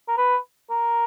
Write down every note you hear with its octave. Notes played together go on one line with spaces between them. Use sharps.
A#4
B4
A#4